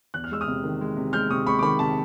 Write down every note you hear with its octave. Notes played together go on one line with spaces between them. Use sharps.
E2 F#6
F6
G#3 E6
D#6 F6
C3
D#3
G#3
C3
G#3 F6 G6
C3 C#6 D#6
G#3 B5 C#6
D6
D#3 B5 C#6
C3 A5 B5